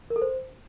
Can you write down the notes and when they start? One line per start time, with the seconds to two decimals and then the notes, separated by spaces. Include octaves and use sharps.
0.10 A#4
0.16 A4
0.22 C5